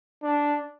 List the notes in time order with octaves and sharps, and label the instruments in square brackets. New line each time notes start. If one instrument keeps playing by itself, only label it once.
[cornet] D4